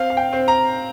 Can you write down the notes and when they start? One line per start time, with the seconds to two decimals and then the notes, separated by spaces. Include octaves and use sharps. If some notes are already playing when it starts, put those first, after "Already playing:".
Already playing: C4 F5
0.10 F5
0.17 G5
0.33 C4
0.48 A#5